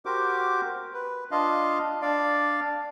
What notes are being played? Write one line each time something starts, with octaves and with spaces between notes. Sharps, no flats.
F#4 G4 A#4 C5 D6
B4
D4 F4 D#5 F5
D4 D5 F5